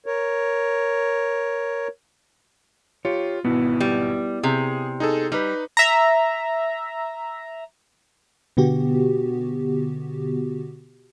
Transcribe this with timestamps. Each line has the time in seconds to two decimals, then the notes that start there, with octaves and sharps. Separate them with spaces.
0.06 A#4 C#5
3.05 F4 G4 C#5
3.45 G#1 B2 B3 E4
3.80 G3
4.43 C3 G#4
5.00 D#4 G#4 A4
5.32 G3 D#4 B4
5.77 E5 A#5
8.57 B2 D3 B3 F#4 G4